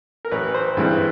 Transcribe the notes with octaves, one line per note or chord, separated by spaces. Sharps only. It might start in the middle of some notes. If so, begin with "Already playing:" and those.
A#4
A1 B4
C5
G2 E3 G#3 C4 B4